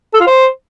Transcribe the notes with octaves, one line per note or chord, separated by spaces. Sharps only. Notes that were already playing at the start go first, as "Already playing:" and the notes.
A4
F4
C5